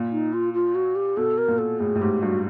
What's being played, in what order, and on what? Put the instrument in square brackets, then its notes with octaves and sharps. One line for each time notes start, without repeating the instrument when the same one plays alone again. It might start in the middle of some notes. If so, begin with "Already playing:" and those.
Already playing: [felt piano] A#2
[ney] D#4
F4
F4
F#4
G4
[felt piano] B2 [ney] A4
[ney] A#4
[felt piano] A#2
[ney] A4
[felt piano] A2 [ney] G#4
[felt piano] A2
[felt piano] G#2 [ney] G4
[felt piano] G2 [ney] F#4